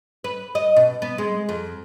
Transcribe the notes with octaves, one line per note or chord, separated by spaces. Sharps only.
B4
D#5
B2
B3
G#3
F2